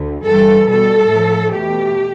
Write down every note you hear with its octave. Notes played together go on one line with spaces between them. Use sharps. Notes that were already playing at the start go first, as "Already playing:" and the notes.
Already playing: D2 D3
G2 E3 G3 A4
B2 G3 A4
A2 F3 A3
E2 B2 A3 G4